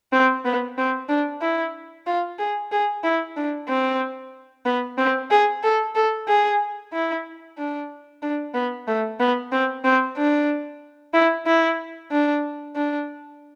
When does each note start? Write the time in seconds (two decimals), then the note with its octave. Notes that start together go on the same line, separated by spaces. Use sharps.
0.12 C4
0.45 B3
0.78 C4
1.09 D4
1.41 E4
2.07 F4
2.39 G#4
2.72 G#4
3.04 E4
3.36 D4
3.69 C4
4.66 B3
4.98 C4
5.31 G#4
5.63 A4
5.95 A4
6.28 G#4
6.93 E4
7.58 D4
8.22 D4
8.54 B3
8.87 A3
9.20 B3
9.52 C4
9.85 C4
10.17 D4
11.14 E4
11.46 E4
12.11 D4
12.75 D4